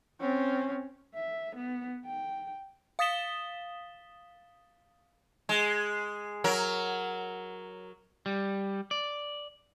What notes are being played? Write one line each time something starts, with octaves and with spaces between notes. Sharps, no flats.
C4 C#4
E5
B3
G5
F5 D#6 A6 B6 E7 G7
G#3
F#3 A#4
G3
D5